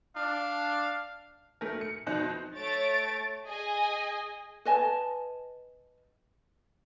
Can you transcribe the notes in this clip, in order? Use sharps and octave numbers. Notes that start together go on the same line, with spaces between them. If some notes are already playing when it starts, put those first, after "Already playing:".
D4 F5
A3 A#4
C#7
F2 B2 D#4 C5 F#6
A3 C#5 A6 D7
G#4 D#5 G#5
B4 D#5 G#5 A5